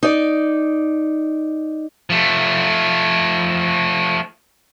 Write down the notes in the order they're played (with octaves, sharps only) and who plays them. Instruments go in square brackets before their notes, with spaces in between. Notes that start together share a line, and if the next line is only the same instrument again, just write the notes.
[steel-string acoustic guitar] D#4 D5
[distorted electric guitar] F3 A3